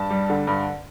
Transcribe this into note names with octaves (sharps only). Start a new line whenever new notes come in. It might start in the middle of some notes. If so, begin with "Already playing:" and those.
Already playing: G2 A5
G3
D3
G2